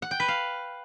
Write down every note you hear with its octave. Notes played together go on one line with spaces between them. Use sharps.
F#5
G5
B4
F5